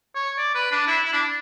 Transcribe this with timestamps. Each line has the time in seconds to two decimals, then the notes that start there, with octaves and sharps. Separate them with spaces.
0.15 C#5
0.38 D5
0.55 B4
0.71 D4
0.87 E4
1.05 E4
1.13 D4